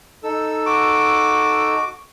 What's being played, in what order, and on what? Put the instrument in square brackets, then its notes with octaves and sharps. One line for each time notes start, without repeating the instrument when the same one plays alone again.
[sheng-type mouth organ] D#4 A4 E6
[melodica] F#4 D6